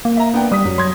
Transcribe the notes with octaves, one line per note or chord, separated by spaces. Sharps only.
A#3
E5 A#5
B3 D4 G5
G3 D#6 B6
F#2 F#3
F#3 C6 G#6 A#6